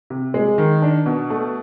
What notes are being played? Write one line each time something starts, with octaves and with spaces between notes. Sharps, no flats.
C3
G#3
D#3
D4
B2
A3